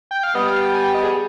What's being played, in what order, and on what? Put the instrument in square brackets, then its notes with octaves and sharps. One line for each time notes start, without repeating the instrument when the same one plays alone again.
[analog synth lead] G5
F5
[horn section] G3 B3 [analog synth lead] D#5
[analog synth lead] F5
G5
G#5
G5
D#5
G#4